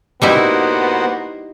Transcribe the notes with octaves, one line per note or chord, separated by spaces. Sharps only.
G3 A#3 B3 D#4 E4 F#4 C5